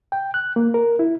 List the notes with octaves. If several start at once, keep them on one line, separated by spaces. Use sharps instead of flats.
G5
F#6
A#3
A#4
E4